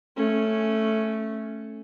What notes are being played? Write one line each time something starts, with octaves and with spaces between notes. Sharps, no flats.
A3 C#4